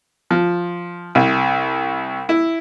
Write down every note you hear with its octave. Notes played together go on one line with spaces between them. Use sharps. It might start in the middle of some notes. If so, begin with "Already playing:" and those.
F3
C2
E4